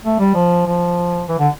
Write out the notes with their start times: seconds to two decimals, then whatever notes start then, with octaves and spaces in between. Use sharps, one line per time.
0.04 A3
0.20 G3
0.35 F3
0.66 F3
1.28 E3
1.39 D3